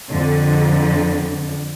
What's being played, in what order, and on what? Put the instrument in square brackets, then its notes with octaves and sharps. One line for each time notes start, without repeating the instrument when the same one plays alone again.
[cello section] F2 D3